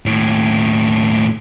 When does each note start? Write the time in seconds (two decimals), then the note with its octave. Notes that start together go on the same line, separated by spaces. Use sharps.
0.06 D#2 A2